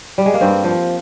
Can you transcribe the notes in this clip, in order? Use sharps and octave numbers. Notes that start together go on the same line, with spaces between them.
G3
G#3
A#3
G2 C4
F3